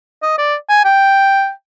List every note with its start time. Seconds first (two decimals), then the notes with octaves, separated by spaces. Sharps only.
0.23 D#5
0.38 D5
0.69 G#5
0.85 G5